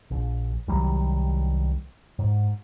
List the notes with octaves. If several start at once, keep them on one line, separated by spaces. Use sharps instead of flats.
A#1
C2 D#3 F#3 G3
G#2